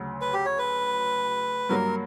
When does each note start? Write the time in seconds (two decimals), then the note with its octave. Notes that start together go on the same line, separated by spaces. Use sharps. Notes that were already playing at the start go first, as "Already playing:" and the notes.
Already playing: D2 C#3 F#3
0.21 B4
0.33 G4
0.46 C#5
0.59 B4
1.69 G2 F#3 A#3 A#4